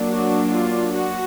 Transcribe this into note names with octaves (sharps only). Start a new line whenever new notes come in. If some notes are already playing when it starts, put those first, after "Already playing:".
Already playing: F#3 A#3 D4
F#4
F4
F#4